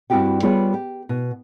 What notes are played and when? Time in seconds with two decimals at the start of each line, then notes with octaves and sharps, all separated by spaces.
0.10 G2 C4 E4 F#4 G4 G5
0.42 G3 B3 F4 G#4 B4 C#5
0.74 G4
1.09 B2